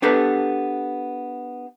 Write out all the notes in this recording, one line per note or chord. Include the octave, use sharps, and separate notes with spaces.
B3 D4 G4 A4 B4